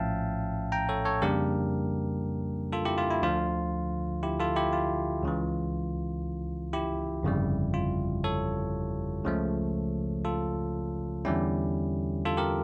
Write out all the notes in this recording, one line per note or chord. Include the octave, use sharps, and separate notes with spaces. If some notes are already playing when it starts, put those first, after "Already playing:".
Already playing: A#1 A2 F3 C#4 E5 F5 G5 A5
G5 A#5
A4 C#5
A4 C#5
F2 C#3 G3 A#3 D4 G4 A#4
F4 A4
E4 G4
F4
E4
D2 D3 F3 F4
E4 G4
F4 A4
E4 G4
F4
C#2 C#3 E3
E4 G4
G1 F2 C#3 G3
F4
A4 C#5
C#2 C#3 F3 A3
F4 A4
E2 D3 G3 C#4 E4 G4
F4 A4
G4 A#4